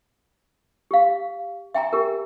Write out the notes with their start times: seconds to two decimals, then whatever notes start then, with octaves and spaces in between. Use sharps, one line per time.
0.91 G4 F5
1.74 E5 G5 G#5 A#5
1.93 G4 A#4